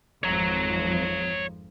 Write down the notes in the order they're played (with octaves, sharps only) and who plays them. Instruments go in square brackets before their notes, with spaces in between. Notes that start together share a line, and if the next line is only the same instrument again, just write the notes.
[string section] G#1 F2 F3 [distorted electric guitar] C#5 A#5